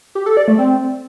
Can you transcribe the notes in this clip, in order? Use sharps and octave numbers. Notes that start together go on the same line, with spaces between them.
G4
A4
D5
A3
C4